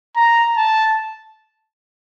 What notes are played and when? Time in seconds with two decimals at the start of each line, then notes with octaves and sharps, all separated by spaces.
0.16 A#5
0.57 A5